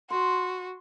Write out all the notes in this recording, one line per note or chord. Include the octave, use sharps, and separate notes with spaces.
F#4 C6